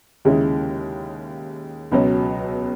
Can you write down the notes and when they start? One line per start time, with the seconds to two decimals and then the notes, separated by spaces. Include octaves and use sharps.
0.25 D#2 C#3 G#3 C#4 E4
1.91 C#2 B2 F#3 C#4